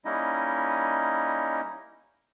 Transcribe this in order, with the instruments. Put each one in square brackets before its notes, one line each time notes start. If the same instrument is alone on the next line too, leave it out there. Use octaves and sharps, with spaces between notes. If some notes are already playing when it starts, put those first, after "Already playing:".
[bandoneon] G3 A#3 C#4 D#4 E4 D#5